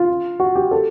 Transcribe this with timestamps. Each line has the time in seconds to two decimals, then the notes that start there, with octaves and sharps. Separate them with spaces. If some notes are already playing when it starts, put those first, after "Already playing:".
Already playing: F4
0.40 F#4
0.55 G4
0.71 A4